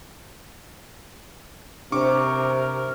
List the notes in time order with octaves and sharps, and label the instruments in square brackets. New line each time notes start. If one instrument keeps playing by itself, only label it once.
[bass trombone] C3 [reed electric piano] D4 C5 [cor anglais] A#4 [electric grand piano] C#6 D6